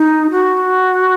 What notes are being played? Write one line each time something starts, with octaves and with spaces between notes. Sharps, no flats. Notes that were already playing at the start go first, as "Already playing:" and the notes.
Already playing: D#4
F#4